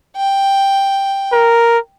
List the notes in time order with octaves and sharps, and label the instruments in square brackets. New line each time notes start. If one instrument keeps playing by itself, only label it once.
[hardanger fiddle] G5
[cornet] A#4